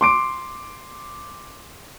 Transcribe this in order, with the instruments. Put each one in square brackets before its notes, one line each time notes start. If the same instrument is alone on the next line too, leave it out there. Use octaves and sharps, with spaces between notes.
[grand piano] C6 D6 D7